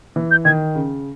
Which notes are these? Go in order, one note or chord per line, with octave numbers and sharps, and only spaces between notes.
E3
G6
D#3 G#6
C#3